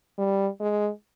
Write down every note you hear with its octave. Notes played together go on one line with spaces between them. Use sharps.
G3
G#3